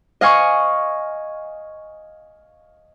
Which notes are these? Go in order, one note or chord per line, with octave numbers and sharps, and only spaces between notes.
D#5 F5 G#5 C#6